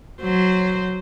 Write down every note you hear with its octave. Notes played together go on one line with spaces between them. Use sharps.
F#3 C5